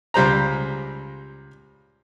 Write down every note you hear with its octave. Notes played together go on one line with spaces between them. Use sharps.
C#2 G3 C5 A#5